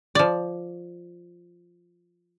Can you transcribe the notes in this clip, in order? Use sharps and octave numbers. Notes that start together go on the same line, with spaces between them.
F3 D5